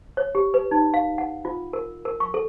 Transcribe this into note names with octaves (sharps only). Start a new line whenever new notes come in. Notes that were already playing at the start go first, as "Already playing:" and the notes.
C#5
G4
B4
D#4
F5
F#5
F4
A#4
A#4
C#6
A4